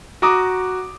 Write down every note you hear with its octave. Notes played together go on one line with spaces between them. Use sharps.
F#4 A#5 D6 D#6